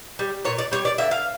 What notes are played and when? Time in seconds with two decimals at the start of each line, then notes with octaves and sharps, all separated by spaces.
0.19 G3
0.45 A#2 C#5
0.58 D5
0.72 G3 C#5
0.85 D5
0.98 D3 E5
1.11 F5